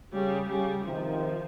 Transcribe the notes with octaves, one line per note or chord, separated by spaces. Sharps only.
C#3 G3
C#3 G3
C3 D#3 F3